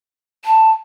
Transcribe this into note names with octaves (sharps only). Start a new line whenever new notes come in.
A5